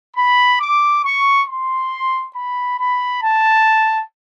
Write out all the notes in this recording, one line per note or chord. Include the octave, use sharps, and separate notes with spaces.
B5
D6
C#6
C6
B5
B5
A5